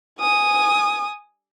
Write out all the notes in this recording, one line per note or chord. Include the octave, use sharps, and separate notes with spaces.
G#5 D#6